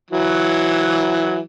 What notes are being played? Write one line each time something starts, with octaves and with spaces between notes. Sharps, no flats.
E3 F#3